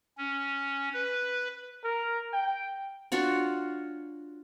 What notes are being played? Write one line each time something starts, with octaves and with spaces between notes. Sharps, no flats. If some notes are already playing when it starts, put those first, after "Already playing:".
C#4
B4
A#4
G5
D4 F4 F#4 C#5